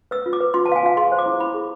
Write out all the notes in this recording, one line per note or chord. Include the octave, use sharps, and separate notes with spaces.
B4 E6
F4
D6
B4
F4 C6
A5
B4 F5
G#5
F4 F5
G#4 C6
C5
D6
E4
E4 B5
G#4